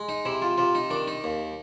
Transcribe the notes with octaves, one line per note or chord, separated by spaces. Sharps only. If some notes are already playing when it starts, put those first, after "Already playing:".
Already playing: G#3
D#4
C3 E4
F4
C3 F4
D#4
D#3 D4
D#4
D#2